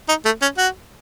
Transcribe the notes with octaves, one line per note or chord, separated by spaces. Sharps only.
D#4
A3
C#4
F#4